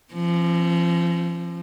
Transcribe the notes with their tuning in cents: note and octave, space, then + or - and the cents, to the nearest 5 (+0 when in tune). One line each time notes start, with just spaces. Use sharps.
F3 -30 C4 +30